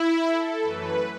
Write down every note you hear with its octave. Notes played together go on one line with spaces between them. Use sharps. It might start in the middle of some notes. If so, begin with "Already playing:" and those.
Already playing: E4
A4
F#2 E3 A3 B4